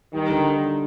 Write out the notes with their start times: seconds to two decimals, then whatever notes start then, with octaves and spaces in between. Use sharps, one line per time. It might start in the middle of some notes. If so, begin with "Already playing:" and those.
0.13 D#3 G3
0.30 D3